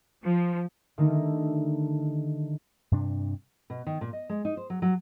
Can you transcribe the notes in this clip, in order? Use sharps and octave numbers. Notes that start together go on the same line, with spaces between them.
F3
D3 D#3 G3 A3 D#4 A#4
G2 C3 D4
B2
D#3
A#2
D#5
G#3
D#4
C5
F#3
F#3